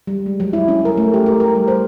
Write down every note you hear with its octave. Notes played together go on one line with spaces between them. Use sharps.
G3
G#3
F#3
E4
C#4
A#4
A3
G4
A#4
A#4
G3
C5